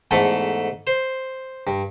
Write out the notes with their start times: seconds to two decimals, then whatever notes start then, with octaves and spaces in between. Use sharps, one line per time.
0.11 E2 G#2 A3 A4 A5
0.87 C5
1.67 G2